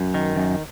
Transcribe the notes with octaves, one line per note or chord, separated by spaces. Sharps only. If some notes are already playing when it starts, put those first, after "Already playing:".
Already playing: F#2
D#3
F#2